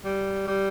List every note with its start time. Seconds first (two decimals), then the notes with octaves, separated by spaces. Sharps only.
0.05 G3
0.48 G3